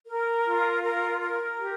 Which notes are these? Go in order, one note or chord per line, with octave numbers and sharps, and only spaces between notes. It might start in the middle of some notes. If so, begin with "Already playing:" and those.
A#4
F4
A#4
A#4
G4